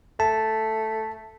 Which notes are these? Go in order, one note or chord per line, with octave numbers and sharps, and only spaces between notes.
A3 A5